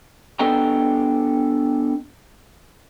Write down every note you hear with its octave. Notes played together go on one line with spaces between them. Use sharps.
B3 D4 A4 D#5 G5 A#5